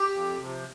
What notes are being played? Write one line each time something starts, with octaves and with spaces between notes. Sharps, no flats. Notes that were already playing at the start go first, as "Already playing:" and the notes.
Already playing: G4
F2
C3 F3